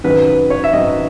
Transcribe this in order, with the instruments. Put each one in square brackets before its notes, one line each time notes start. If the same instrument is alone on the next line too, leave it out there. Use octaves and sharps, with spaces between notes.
[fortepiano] G#1 F#2 D#3 B4
B4
C#5
E5
G#1 F#2 D#3 D#5